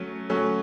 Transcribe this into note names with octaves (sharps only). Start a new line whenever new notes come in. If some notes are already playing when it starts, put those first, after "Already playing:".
Already playing: F#3 A3 C#4
F#3 A3 C#4